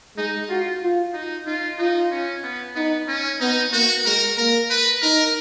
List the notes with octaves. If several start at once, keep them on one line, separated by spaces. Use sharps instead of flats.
G#3 D#4
F4 F#4
F4
D#4
D#4 F4
D#4 F4
C#4
B3
B3 D#4
C#4
B3 D#4
A#3 F#4
G#3 A#4
A#3 A#4
B4
D#4 A#4